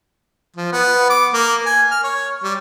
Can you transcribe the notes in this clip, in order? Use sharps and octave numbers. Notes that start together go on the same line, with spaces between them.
F3
B3
D6
A#3
G#5
F6
C#5
G3